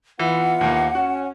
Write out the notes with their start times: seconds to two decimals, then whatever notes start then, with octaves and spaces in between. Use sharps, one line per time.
0.19 E3 B3 E4 F4 F#5
0.61 D#2 A#3
0.95 C#4 F#4